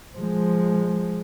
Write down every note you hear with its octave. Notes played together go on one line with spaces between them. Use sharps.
F3 G#3